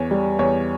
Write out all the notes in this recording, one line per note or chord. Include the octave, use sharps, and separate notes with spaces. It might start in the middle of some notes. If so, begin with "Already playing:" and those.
Already playing: E2 C#5
G3
E2 C#5